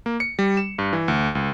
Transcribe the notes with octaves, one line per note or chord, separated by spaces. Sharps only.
A#3
C#7
G3
E7
G2
E3
D2
C#2